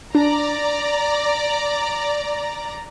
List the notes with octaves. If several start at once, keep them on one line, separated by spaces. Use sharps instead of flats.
D4 D5 A#5